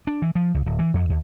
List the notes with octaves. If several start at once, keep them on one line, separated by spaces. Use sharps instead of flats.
D4
E3
F3
C#2
D1
E3
F2
D#2